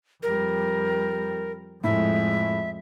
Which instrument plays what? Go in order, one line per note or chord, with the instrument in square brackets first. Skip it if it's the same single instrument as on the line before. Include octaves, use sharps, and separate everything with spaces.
[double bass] F2 G3 [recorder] A#4
[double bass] F2 G#3 [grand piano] A2 [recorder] E5